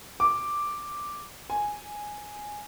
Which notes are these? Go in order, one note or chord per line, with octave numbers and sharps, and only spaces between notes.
D6
G#5